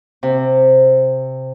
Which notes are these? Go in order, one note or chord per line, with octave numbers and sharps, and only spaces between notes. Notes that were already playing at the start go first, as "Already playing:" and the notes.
C3